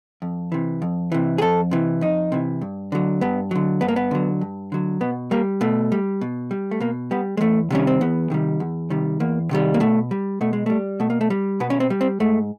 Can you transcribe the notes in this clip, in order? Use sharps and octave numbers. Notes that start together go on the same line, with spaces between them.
F2
C3 E3
F2
C3 E3
G#4
F2 A4
C3 E3
F2 D#4
C3 E3
G2
D3 F#3
G2 B3
D3 F#3
G2 B3
A#3
B3
D3 F#3
G2
D3 F#3
B2 B3
G3 A#3
B2 A3
G3
B2
G3
A3
B2 A#3
G3 B3
G#3
E2 A3
C3 D#3 G3 C#4
C4
E2 B3
C3 D#3 G3
E2
C3 D#3 G3
E2 A#3
C3 D#3 G3
A#3
B2 A3
G3
B2 A3
G#3
G3 A3
B2 A3
A#3
A3
G3
B2 B3
C#4
C4
G3
C4
G#2 A3